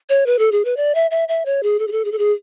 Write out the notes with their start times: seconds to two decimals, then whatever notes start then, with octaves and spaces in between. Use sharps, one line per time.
0.09 C#5
0.26 B4
0.39 A4
0.52 G#4
0.65 B4
0.77 D5
0.95 E5
1.11 E5
1.28 E5
1.46 C#5
1.63 G#4
1.79 A4
1.88 G#4
1.92 A4
2.05 G#4
2.12 A4
2.18 G#4